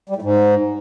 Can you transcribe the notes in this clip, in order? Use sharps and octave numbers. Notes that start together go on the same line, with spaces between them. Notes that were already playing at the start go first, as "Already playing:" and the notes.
G3
A2
G#2